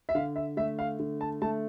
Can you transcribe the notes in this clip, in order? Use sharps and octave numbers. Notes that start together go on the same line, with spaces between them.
E5
D3 F5
E5
A3 E5
F5
D3
A5
A3 A5